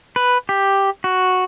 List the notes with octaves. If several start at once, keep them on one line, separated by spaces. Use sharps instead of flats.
B4
G4
F#4